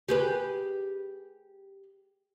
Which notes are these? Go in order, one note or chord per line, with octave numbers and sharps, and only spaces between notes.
G4 G#4 B4